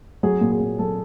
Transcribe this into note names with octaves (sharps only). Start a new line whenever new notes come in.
F#3 G#4
A#2
G#4
A#2
F#3 A4